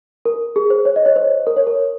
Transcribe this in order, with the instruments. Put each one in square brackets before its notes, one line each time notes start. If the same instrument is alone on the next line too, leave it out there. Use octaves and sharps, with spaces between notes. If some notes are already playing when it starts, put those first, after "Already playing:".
[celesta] A#4
G#4
C5
C#5
D#5
C#5
C5
A#4
C#5
A#4